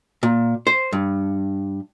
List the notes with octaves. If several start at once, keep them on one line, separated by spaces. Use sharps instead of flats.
A#2
C5
G2